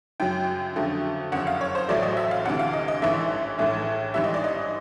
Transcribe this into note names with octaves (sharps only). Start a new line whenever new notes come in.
F#2 C#3 F#3 G5
F2 D3 F#3 A3
F#1 F2 C#3 F#5
F5
C#5
C5
A1 A2 F#3 A3 D5
D#5
E5
F5
D2 C3 E3 F#5
F5
D#5
D#5
A1 G#2 E3 A3 E5
A#1 A2 E3 A3
A1 G#2 E3 G3 E5
D#5
D5
D#5